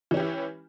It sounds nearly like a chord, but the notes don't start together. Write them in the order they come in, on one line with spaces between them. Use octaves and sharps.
E3 C#4 G4 E4